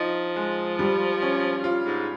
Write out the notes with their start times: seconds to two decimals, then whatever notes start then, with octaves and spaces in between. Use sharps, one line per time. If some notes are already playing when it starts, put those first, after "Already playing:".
Already playing: F3 D#4
0.36 G#3
0.79 G3
1.22 C#4
1.64 F4
1.86 G#2